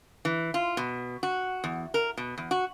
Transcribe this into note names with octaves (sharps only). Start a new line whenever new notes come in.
E3
F4
B2
F#4
E2
A#4
B2
E2
F#4